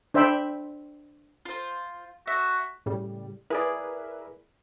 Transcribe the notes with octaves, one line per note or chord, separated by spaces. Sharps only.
D4 C5 E5 G5 B5 E6
F4 C5
F#4 E5
A2 C#3 G3
E4 G#4 A#4 B4 D5 E5